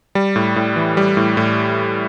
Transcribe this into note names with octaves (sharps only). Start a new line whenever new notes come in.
G3
A2
A2
E3
G3
A2
A2